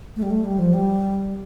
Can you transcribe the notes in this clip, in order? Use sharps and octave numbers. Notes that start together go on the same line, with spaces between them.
A3
G3
A3
G3
F3
G3